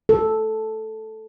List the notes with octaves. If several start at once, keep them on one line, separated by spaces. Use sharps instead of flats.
A4